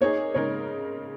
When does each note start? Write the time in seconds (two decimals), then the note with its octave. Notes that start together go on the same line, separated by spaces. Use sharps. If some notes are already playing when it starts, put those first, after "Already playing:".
0.01 A#3 D#4 G#4 C#5
0.34 C#3 G#3 D#4 A#4 C#5